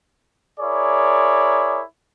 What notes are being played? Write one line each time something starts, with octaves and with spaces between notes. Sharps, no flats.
E4 G#4 A#4 C#5 D5